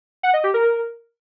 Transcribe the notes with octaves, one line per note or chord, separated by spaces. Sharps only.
F#5
D#5
G4
A#4